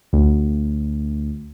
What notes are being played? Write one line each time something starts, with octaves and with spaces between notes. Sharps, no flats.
D2